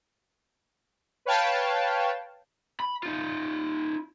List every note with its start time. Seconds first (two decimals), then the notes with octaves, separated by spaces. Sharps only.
1.25 B4 C#5 F5 G5 A5
2.80 B5
3.03 D#4 F4